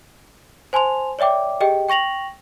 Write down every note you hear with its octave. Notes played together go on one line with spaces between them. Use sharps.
C5 G#5 A5 C6 F7
C#5 D5 E5 G5 D6
G4 G#4 D#5 G5
G5 C#6 A#6 F7 F#7